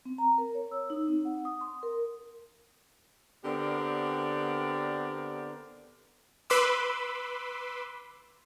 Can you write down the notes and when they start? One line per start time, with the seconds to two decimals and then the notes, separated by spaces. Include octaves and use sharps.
0.05 C4
0.18 A#5
0.38 A#4
0.55 C#5
0.71 E6
0.90 D#4
1.08 C4
1.25 F#5
1.45 D#6
1.61 C6
1.83 A#4
3.44 D3 B3 C4 G4 A#4 D5
6.50 B4 B5 C6 D6 E6